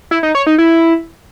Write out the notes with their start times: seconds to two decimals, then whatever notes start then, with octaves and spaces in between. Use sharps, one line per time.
0.11 E4
0.23 D#4
0.35 C#5
0.47 D#4
0.58 E4